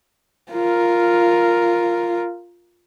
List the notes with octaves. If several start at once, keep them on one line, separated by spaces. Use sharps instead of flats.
F4 A#4